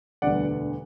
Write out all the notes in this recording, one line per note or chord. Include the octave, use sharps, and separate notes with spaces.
E1 D2 D3 G3 B3 D5 F#5